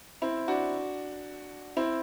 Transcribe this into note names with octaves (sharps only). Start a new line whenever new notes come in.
C4 E4
D4 F#4
C4 E4